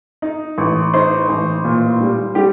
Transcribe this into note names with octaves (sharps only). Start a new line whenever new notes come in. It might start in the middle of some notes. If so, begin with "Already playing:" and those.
D#4
A1
D#4 C5
A1
A#2
G3
G3 G4